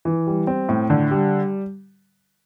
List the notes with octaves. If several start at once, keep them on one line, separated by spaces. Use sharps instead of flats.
E3
G3
C4
A2
D3
G3